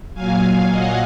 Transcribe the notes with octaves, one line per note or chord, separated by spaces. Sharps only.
A#2 F#3 F5 G#5
D#5 F#5